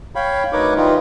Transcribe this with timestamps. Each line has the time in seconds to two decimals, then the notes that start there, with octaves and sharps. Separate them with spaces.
0.15 C#5 F5 G5 B5
0.53 D2 D#4 A#4 B4 C#5 D6
0.76 E3 G3 D#4 F4